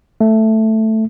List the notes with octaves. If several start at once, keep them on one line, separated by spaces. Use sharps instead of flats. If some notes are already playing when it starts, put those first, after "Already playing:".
A3